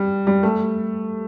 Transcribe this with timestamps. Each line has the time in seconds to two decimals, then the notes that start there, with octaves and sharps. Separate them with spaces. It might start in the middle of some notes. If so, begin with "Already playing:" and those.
Already playing: G3
0.27 G3
0.43 A3